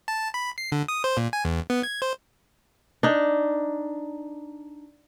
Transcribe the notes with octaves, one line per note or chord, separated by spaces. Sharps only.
A5
B5
C7
D3
D#6
C5
A#2
G#5
E2
B3
G#6
C5
D4 D#4